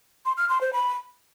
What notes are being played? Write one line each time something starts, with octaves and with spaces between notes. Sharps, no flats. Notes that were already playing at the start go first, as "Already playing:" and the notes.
C6
F6
C6
C5
B5